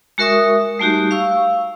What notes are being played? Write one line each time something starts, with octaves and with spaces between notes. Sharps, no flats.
G#3 F#4 A#4 E5 C#6 D#6
G3 A3 D#4 F#4 G4
F5 C#6 E6